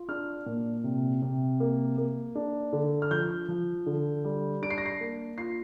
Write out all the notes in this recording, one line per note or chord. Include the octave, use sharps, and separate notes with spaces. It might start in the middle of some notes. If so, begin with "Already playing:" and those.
Already playing: F4
D4 F6
A#2
C3
C3
A#3
A#3
D4
D3
F6
F3 G6
F3
D3
G3
D4 D7
C7
A#6
C7
A#3
F4 C7